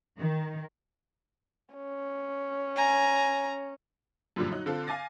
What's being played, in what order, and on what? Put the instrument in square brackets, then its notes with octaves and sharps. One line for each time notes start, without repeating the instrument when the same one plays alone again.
[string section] D#3
[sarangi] C#4
[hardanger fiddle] G#5 A#5
[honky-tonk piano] F#2 A#2 D3 F3 G3
F#3 D#4 F#6
D3 C4 F4 A4
F5 G#5 D6 A6 A#6